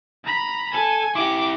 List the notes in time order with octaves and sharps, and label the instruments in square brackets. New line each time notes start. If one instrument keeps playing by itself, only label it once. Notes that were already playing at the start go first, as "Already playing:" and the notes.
[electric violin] A#5 B5
[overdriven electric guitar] A4 [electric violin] G#5
[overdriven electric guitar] E4 G4 [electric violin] D6